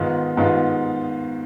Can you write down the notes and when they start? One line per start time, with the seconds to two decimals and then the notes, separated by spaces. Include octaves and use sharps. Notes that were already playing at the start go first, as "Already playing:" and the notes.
Already playing: G#2 D#3 B3 F4
0.37 G#2 D#3 B3 F4